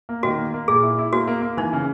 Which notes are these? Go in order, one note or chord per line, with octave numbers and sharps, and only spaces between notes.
A#3
D#3 F#4
A#3
A#3
A#2 G#4
E4
E4
A#3 F#4
A#3
A#3
E3 D#4
C#3